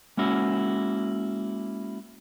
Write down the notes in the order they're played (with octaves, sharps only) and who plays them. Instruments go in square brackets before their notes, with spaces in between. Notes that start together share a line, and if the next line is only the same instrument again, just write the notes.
[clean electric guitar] G#3 A#3 C#4 E4 F#4